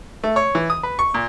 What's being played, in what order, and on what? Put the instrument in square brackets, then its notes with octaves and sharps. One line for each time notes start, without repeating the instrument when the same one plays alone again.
[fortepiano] A3
C#5
E3
D#6
B4
C#6
A#2